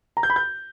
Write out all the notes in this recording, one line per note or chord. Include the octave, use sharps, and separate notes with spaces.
A#5
G6
B5
G6